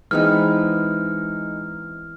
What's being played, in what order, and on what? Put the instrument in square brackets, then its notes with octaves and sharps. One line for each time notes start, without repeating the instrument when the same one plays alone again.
[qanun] E3 B3 C4 [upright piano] G#3 D#4 [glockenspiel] F6